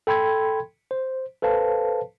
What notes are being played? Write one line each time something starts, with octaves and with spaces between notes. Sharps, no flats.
A4 G5 B5 C6 G#6
C5
A4 B4 C5 F5 A5